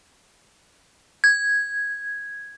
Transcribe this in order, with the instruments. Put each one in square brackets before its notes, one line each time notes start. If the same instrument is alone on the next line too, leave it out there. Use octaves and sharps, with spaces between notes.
[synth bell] G#6